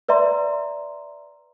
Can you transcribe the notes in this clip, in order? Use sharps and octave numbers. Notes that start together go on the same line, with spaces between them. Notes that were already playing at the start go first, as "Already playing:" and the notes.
B4 D5 E5 A#5 C6